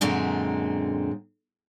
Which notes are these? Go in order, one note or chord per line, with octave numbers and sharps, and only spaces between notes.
F#2 A#2 D3 G#3 C4